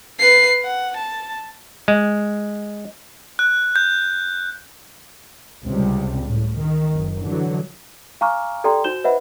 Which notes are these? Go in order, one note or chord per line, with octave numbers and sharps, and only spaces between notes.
B4 C7
F#5
A5
G#3
F#6
G6
C#2 C3 G3
A2
D#3
F#1
D3 E3 F#3
F5 G#5 A#5 C#6 D6 F6
G4 A4 D5 G5 A#5 C6
D#4 F#4 C5 G6 E7 G7
B4 C5 D#5 E5 F#5 B5